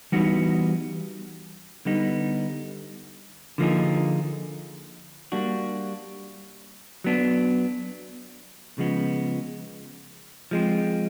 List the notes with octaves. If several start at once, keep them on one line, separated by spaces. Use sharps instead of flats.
E3 G3 B3 D#4 F#4
D3 G3 B3 D#4
D3 F3 A#3 D#4 G#4
G3 A#3 D4 F#4
F#3 B3 D4
C#3 F3 G#3 B3
F3 G#3 C4